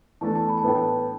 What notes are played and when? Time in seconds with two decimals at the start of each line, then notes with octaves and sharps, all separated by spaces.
0.21 E2 E3 A3 D4 A4 A5
0.35 A5
0.49 B5
0.58 A5
0.63 A2 E3 B3 D4 A4 G5
0.77 A5